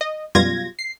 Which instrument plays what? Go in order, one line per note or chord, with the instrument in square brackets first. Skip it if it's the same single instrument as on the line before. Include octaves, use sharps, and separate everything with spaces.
[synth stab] D#5
F#2 B2 G3 F4 G#6 A#6
C7